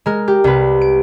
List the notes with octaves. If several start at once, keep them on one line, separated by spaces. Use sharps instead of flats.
G#3 A#4
G4
C2 B4
D7